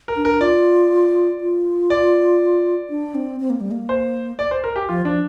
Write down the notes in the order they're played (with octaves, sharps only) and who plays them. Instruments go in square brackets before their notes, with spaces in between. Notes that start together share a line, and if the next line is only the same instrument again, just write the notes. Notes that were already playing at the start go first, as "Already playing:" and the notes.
[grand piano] A#4
[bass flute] D4
[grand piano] A#4
[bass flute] F4 [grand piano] D5
[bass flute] F4
[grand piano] D5
[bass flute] D4
C4
C4
A#3
G3
A#3
[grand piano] C5
D5
C5
A#4
G4
[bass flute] F3 [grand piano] F4
[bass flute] F3 [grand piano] D4